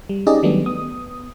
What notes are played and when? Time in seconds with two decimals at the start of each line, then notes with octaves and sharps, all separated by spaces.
0.09 G3
0.26 C#4 D#4 G4 G#4 D5 D#5
0.43 D#3 F#3 G3 A3 B3 D4
0.65 B3 D#6